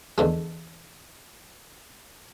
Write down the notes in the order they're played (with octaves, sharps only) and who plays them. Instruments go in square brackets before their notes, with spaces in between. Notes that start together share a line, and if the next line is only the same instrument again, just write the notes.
[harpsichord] E2 D3 G#3